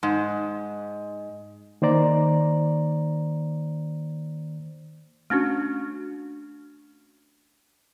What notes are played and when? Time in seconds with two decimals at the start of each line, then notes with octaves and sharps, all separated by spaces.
0.03 G#2
1.82 D#3 A#3 C5 D5 A#5
5.30 A3 C#4 D4 F#4